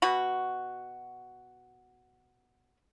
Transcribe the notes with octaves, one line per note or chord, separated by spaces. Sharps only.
B2 F#4 B5